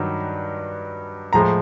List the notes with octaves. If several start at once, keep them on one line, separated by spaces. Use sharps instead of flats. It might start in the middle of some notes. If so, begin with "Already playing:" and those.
Already playing: G2 D#3 F#3
A2 F3 G#3 A#5